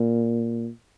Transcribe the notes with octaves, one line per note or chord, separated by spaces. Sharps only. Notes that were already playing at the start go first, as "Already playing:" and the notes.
Already playing: A#2